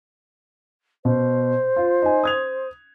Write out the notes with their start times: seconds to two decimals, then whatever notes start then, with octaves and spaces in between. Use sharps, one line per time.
1.05 B2 C5
1.76 F4
2.02 D#4 G#5
2.24 D#6 G#6 F7